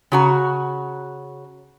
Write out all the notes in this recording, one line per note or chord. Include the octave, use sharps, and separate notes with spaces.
C#3 F#4 A#5